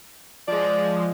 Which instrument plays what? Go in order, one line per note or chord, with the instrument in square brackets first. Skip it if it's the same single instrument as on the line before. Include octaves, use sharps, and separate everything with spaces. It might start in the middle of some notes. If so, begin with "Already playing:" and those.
[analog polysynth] F3 G#3 [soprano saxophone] D5